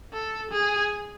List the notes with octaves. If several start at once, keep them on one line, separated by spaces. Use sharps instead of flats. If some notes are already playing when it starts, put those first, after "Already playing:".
A4
G#4